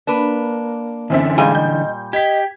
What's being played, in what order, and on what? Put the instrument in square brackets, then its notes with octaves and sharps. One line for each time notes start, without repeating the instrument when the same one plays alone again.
[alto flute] A#3 [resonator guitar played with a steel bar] D4 B4
[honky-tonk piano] F#2 C4 E5 [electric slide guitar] D3 E3
[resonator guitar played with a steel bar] A#2 G3 G#5 [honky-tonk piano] G#3 [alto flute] F5
[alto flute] D#5 [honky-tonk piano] G6
[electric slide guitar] G4 [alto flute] D#5 [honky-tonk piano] G#6 B6